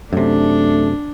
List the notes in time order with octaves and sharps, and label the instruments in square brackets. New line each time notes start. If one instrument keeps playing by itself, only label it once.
[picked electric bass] F#2 C3 [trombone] A3 [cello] D4